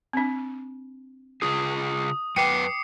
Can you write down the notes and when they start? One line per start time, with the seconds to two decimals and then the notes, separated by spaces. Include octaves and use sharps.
0.13 C4 D4
1.42 C#3 F4 G#4 D#6
2.36 F#2 B4 F#5 G5 D6 C7 C#7